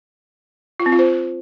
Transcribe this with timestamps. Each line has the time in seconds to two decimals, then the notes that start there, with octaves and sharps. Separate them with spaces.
0.80 F4
0.86 C4
0.92 F4
0.99 C5